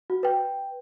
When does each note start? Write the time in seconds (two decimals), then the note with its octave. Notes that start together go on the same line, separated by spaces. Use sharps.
0.10 F#4
0.23 B4 G5